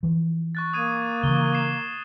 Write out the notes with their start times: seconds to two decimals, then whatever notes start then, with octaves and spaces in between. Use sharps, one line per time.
0.03 E3 F3
0.55 C#6 F#6 A6
0.73 A#3 D#6 G#6 D#7
1.23 C#3 E3 C#6 G7
1.54 C7 E7